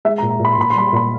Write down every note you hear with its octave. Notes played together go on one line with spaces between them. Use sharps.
G#3 E5
A#5
A#2
A#5
A#2
B5
C6
A#2 B5
C6
G3 B5
C6
A#2 B5